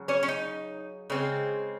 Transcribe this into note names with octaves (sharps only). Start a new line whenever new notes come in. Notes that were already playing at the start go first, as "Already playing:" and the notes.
Already playing: C#3 F#3
C#4 C#5
C#4
D#4
C#3 G#3 C4